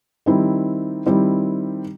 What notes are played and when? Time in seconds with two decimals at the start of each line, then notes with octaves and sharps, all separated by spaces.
0.26 D#3 G3 C4 E4
1.06 D#3 G3 C4 E4